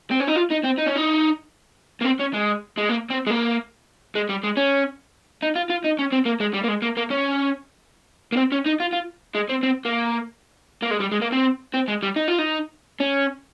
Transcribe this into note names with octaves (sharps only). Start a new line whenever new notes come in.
C4
C#4
D#4
F4
D#4
C4
D#4
C#4
D#4
A#3
C4
C#4
G#3
G#3
A#3
C4
G#3
A#3
G#3
G3
G#3
C#4
D#4
F4
F4
D#4
C#4
C4
A#3
G#3
G3
A#3
G#3
A#3
A#3
C#4
A#3
C4
C#4
D#4
F4
F4
G#3
C4
C4
A#3
A#3
G#3
G3
G#3
A#3
C4
C4
G#3
G3
D#4
F4
D#4
C#4